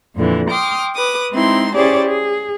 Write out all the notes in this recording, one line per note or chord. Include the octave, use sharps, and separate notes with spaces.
F2 A#2 D3 E3
G5 C6 D6 D#6 F6
B4 D6 D#6
G#3 C4 D#4 E4 C6
C#4 E4 G4 G#4 C5 D5
G#4